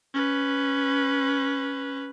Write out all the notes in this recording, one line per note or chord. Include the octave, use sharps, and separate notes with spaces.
C#4 B4